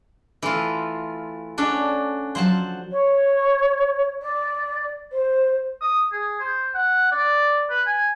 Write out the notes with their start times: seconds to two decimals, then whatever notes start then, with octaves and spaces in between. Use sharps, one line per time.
0.42 E3 A3 F4
1.58 C#4 D4 F#4 A4 D5
2.35 F3 F#3 C5 F#5 A5
2.91 C#5
4.21 D5
5.12 C5
5.81 D#6
6.12 G#4
6.40 C5
6.75 F#5
7.12 D5
7.70 B4
7.86 G#5